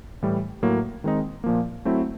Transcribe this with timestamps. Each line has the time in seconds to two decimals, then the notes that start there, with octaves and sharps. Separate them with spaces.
0.22 A2 E3 G3
0.62 A2 F#3 A#3
1.04 D#3 G#3 C4 D#4
1.44 A#2 F3 A#3
1.85 F#3 A3 C4 E4